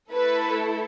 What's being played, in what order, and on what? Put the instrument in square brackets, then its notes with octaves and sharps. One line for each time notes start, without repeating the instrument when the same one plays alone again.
[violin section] A3 E4 A4 B4